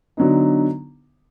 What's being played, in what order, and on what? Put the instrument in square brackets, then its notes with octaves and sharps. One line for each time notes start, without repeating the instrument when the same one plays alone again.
[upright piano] D3 F#3 B3 D#4